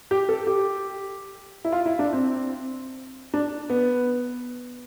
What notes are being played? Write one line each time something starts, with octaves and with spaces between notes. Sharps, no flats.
G4
A4
G4
E4
F4
E4
D4
C4
D4
B3